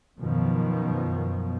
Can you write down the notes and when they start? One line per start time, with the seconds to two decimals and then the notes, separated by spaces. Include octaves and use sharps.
0.20 F#2 B2 D#3 F3